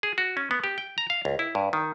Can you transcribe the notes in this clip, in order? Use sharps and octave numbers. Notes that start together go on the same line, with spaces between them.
G#4
F#4
C#4
B3
G4
G5
A#5
F5
C#2
E4
G2
D#3